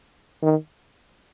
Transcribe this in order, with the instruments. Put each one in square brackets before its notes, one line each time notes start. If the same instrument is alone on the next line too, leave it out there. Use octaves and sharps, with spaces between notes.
[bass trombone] D#3